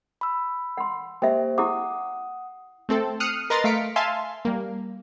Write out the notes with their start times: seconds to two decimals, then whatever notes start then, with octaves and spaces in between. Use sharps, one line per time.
0.21 B5 E6
0.77 F#5 C6
1.22 A#3 G4 C5 E5 G5
1.58 E4 G4 F#5 D6 D#6
2.89 A3 C4 A4
3.20 D#6 F6 F#6 C7 C#7 D#7
3.50 A#4 B4 D#5 A#5 C6 A6
3.64 A3 F5 B6 C#7 D7
3.96 E5 F5 G#5 A5 C6
4.45 G3 A#3